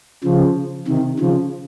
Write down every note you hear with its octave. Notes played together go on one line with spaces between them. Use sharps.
C#3 F3
C3 D#3
C#3 F3